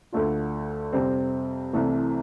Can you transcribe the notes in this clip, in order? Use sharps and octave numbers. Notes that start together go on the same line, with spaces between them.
D2 D3 A3 D4 F4
F2 C3 G3 C4
C2 C3 E3 A3